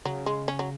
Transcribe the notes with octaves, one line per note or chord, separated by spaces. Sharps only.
C#3 F#3
G#3
C#4
F#3